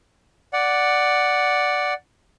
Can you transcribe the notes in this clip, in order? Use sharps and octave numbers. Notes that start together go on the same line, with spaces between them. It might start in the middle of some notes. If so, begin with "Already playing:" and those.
D5 F#5